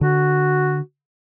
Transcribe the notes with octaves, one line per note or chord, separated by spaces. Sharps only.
D3 F#4